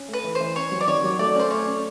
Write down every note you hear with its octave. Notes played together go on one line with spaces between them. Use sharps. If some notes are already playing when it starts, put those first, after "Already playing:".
Already playing: C#4
A3
B4
E3
C5
E3
C#4 C#5
F#3
D5
D#3 C#5
F#3
A3 D5
C#4 C5
A3 C#5
C#4